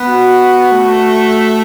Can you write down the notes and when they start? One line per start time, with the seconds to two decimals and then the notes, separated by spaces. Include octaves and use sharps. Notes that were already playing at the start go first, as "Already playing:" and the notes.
Already playing: B3
0.10 F#4
0.72 A3